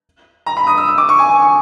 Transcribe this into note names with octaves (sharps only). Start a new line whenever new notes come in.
A#5
B5
D#6
E6
E6
D6
C#6
G#5
G#5
C#6